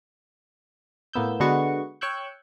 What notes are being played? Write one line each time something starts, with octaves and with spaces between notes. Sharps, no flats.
A2 A#3 B3 E6 G6
D3 G#3 B3 F#4 C#6
C#5 G5 C#6 E6 F#6 G6